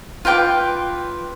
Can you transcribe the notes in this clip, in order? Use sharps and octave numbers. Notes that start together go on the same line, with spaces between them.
F4 B4 G5 D6